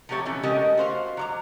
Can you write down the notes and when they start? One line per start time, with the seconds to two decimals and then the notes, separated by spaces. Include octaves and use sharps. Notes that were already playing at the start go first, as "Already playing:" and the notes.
0.09 F3 F#3 A3 G4 C#5 E5
0.25 B2 E3 C#4
0.43 G#3 A3 C#4 G4 A#4 D#5
0.78 F#4 C5 F5
1.17 F#3 D5 A#5